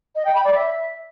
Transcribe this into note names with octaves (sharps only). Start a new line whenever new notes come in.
D#5
G5
B5
D5
E5